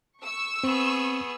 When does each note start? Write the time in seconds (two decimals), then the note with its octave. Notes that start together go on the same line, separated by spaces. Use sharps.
0.23 C#6 E6
0.64 B3 C4 G#4